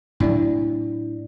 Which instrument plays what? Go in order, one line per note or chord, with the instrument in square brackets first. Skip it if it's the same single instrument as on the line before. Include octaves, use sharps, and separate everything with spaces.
[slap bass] A2 F#3 [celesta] D4 E4 D5